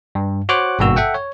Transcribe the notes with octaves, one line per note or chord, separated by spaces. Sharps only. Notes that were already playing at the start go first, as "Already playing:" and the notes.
G2
F#4 C5 C#5 F#5 D6 F#6
G#1 G2 B2 A#3 F#4 E6
A4 E5 F#5 G5
C#5